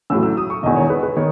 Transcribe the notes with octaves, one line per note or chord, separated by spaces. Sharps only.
A1 A2 F#3 E6
E6
D#6
C#6
E1 E2 D#3 D#5
C#5
B4
B4
D#3 C#5